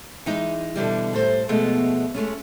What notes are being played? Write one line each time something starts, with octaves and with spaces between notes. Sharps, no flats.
E3 G#3 D#4
B2 D3 E3 G3
A2 A4 C5
B2 F3 G#3 A3 B3
G#3 A3 C#4